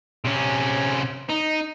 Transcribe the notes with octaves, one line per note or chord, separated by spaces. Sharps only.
C3 C#4
D#4